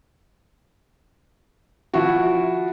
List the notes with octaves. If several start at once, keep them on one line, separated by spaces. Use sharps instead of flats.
F3 E4 F#4